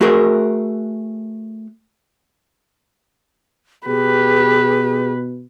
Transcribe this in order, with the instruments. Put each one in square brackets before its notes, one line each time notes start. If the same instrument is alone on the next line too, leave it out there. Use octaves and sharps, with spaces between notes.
[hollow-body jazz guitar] A3 F#4 G#4 A#4
[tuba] B2 [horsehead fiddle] G4 B4 [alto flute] G#4